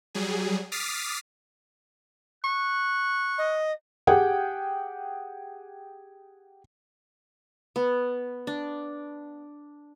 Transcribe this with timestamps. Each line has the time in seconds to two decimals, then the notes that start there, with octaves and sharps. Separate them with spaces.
0.15 F#3 G3 G#4
0.72 D6 D#6 F6 A6 B6 C7
2.44 C#6 F#6
3.38 D#5
4.07 G4 G#4 F#5 G5
7.76 B3
8.47 D4